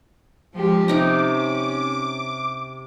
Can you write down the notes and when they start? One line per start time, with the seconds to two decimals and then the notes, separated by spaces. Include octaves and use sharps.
0.54 F3 G#3 G4
0.88 C3 C#4 D#4 A#5 D6